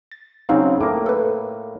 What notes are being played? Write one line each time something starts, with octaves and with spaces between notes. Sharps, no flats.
A6
C#3 F#3 C4 D#4 F5 C6
A2 A#3 D6
A4 B4